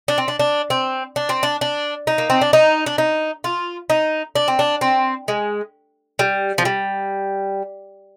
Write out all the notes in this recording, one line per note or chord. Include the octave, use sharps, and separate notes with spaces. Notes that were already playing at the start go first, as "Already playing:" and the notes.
D4
C4
D4
D4
C4
D4
C4
D4
D4
D#4
A#3
C4
D4
D#4
D4
D#4
F4
D#4
D4
C4
D4
C4
G#3
G3
F3
G3